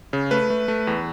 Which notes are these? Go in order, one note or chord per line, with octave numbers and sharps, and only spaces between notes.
C#3
A3 B4
A3
A3
E2